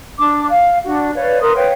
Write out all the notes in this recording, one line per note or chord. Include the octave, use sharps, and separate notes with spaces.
D4 D6
F5
D4 F#4
B4 C#5 D5 F5
A#4 B4 C6 D#6
B4 C#5 F5 G5